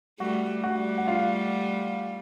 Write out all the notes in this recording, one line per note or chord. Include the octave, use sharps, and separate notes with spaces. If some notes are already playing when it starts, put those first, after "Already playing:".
G3 A3 F#4 F#5
G3 A3 F#4 F#5
F#5
F4 F5